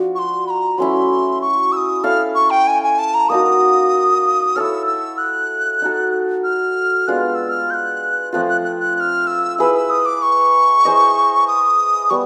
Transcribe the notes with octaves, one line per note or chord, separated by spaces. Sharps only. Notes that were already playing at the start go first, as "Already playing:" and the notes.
Already playing: F3 D4 F#4
C#6
C6
B5
A#5
F#3 A3 C#4 E4 C6
C#6
E6
D#6
E4 A4 C#5 F5 F6
C#6
G5
G#5
G#5
A5
A#5
A#3 D#4 F#4 D#6
E4 A4 C#5 E6 F6
E6
F#6
D#4 F#4 A4
F6
G#3 B3 D4 F4 F#6
F6
E6
F6
G6
F#6
F3 A3 C4 F4 F#6
F#6
F#6
F#6
F#6
F6
E6
E4 G#4 B4 E6
E6
D#6
D6
C#6
E4 G#4 C5 D#5
D#6
G3 B3 C#6